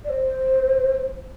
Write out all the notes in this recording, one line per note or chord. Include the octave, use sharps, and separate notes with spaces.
D5
C5